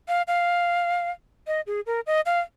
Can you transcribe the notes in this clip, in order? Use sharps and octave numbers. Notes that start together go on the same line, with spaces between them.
F5
F5
D#5
G#4
A#4
D#5
F5